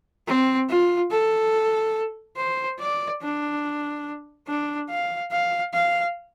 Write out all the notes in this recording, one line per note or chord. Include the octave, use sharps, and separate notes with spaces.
C4
F4
A4
C5
D5
D4
D4
F5
F5
F5